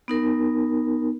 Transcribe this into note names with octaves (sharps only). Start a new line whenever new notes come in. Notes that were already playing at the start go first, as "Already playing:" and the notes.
B3 D#4 A#4